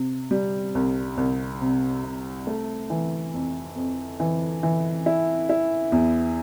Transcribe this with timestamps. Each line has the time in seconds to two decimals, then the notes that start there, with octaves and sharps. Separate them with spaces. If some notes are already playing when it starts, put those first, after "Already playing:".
Already playing: C3
0.31 G3
0.75 C2
1.17 C2
1.61 C3
2.03 C3
2.47 A3
2.90 E3
3.34 F2
3.76 F2
4.20 E3
4.63 E3
5.06 E4
5.49 E4
5.92 E2